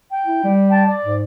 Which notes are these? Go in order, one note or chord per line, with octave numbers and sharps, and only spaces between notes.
G5
E4
G3
G5 A5
D5
G#2